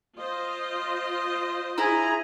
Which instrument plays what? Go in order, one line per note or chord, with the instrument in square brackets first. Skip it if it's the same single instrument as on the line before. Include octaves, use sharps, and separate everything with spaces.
[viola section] F4 C5 D#5
[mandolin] E4 [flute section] G#4 A#5